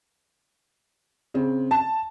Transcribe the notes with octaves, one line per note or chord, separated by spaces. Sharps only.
C#3 C4
A5